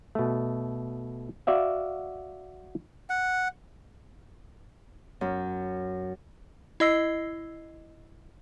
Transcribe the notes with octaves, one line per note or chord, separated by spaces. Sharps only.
B2 A3
F#4 D5 E5 F5
F#5
F#2
E4 D#5 E6 C7